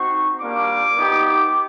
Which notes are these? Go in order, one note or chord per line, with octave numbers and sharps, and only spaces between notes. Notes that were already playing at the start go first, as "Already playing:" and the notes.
Already playing: C4 D#4 F#4 C#6
G3 A#3 D4 F4 D6
B3 D#4 G4